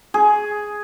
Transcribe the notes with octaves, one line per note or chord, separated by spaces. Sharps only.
G#4